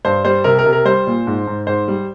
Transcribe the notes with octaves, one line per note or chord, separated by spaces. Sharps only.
G2 C5
G3 C5
C3 A#4
A#4
C3
A#4
G3 C5
A#2
G#2
G#2
G#2 C5
G3